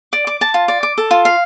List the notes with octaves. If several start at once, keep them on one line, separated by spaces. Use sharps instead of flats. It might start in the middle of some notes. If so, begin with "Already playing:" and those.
D5
D6
A5
F4
D5
D6
A4
F4
F5